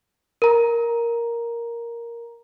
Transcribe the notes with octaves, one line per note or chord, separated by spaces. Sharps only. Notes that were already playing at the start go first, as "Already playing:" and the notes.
A#4 A#5